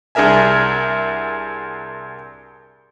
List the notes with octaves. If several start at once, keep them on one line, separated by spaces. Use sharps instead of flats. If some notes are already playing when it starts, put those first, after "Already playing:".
C2 D4 G#4 A#4 E5 G#5